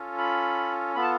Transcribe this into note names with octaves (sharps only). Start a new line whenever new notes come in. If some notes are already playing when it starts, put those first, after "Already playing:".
Already playing: C#4 F4 A4
B5
B3 F4 A4 B5
A5